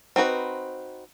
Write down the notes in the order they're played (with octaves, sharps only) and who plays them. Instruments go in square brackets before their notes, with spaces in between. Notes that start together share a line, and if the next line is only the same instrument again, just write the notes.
[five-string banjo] C4 D#4 F#4 B4